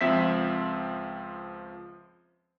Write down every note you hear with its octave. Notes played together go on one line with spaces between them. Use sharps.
C#2 F3 C4 E5 B6